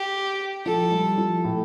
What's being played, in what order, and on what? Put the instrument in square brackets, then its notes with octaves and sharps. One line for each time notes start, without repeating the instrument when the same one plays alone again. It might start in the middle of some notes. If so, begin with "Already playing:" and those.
Already playing: [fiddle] G4
[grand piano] F3 [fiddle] A4
[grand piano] G3
F3
A2